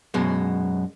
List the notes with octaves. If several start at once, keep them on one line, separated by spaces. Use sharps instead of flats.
F#2 B2 G#3